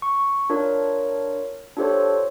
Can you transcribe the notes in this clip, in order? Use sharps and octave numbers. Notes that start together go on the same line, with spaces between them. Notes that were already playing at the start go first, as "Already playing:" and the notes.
C#6
D4 F4 A#4 C#5
D4 F4 G4 A4 C5 C#5